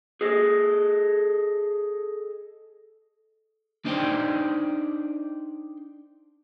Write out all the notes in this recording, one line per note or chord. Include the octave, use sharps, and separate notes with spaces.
G#4 A4 D#5
D4 D#4 C5 D5 G5